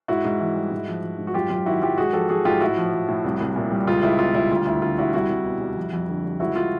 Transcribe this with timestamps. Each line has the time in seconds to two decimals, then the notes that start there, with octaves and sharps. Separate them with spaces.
0.08 G#2 E4 F#4
0.25 G#2
0.40 E3
0.56 G3
0.71 G#2
0.88 F3
1.03 F3
1.18 G#2
1.27 F#4
1.34 F#2 F4 G4
1.50 F#2 F4
1.66 D#3 E4 F#4
1.82 F#3 F4 G4
1.98 G#2 F#4 G#4
2.13 F3 G4 A4
2.29 F3 F#4 G#4
2.45 G#2 F4 G4
2.60 A2 E4 F#4
2.77 F3
2.93 F3
3.08 A2
3.24 C2
3.40 C2
3.56 A#2
3.72 G3
3.87 C#2 F4
4.03 C#2 E4
4.19 B2 F4
4.35 G3 E4
4.51 D2 F4
4.66 D2 E4
4.82 D3 F4
4.98 G3 E4 F#4
5.14 C2 E4 F#4
5.29 C2
5.45 B2
5.61 G3
5.77 F2
5.93 F2
6.09 D3
6.24 G3
6.40 C#2 E4 F#4
6.56 F4